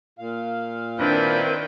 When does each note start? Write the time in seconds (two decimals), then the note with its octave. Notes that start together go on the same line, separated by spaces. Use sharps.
0.19 A#2 F5
0.99 D#3 C4 D4 E4 B4 G5